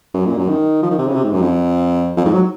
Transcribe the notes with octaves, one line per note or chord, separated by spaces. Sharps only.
F#2
A#2
F#2
D#3
F3
D#3
C3
C#3
C3
G#2
F#2
F2
F2
G#2
F#3